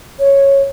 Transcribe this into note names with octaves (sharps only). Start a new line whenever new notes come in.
C#5